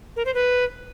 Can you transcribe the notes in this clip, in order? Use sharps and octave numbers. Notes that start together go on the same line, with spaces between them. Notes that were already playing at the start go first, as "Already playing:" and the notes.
A#4
C5
B4